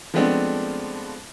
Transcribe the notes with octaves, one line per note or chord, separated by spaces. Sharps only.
F3 G#3 A3 B3 C4 D4